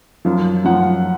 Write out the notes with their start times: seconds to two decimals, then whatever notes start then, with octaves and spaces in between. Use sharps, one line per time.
0.25 F#2 F3 F5
0.64 F#2 F3 F#5